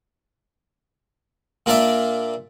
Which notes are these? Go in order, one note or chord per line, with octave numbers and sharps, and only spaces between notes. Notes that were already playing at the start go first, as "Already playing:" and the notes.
A#2 A#3 D4 D5 E5